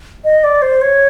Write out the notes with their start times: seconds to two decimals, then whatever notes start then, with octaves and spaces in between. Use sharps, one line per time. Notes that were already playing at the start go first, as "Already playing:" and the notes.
0.24 D#5
0.44 D5
0.62 C5
0.81 C#5